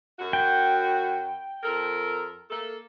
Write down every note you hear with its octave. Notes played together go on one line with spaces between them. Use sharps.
F#2 F#4
G5
F2 A4 A#4
A#3 A4